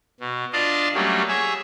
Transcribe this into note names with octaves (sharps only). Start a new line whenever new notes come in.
B2
D4 F4 D5 D#5 F5 A5
F#3 G3 A3 A#3 C#4
G#4 C#5 E5